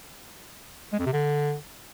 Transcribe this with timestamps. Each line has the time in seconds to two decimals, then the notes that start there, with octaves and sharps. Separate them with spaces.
0.93 G#3
0.99 F2
1.06 C3
1.13 D3